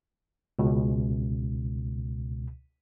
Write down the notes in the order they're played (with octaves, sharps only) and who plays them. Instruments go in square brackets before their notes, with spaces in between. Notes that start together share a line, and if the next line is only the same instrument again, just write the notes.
[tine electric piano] C#2 B2